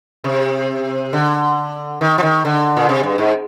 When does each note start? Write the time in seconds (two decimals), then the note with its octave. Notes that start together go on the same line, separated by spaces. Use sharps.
0.24 C3
1.13 D3
2.01 D#3
2.18 F3
2.23 D#3
2.45 D3
2.77 A#2
2.89 C3
3.03 G2
3.18 G#2